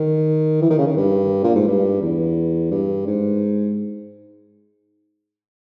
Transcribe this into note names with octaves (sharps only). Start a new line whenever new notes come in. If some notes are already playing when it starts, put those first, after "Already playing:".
Already playing: D#3
E3
D#3
C#3
D#3
G2
A#2
G#2
G2
E2
G2
G#2